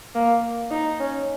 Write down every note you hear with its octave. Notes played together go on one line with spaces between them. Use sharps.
A#3
D#4
C#4